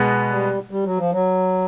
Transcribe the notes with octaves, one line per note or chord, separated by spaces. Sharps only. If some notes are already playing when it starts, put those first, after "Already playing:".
Already playing: B2 G#3 B3
G3
G3
F#3
F3
F#3